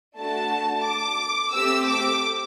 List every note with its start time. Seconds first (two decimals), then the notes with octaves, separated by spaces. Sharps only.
0.17 A3 D4 F#4 A5
0.86 D6
1.52 A3 C4 G4 E6
1.87 D6